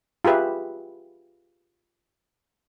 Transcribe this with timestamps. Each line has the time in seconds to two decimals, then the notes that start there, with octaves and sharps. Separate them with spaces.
0.24 F4 G4 G#4 B4 E5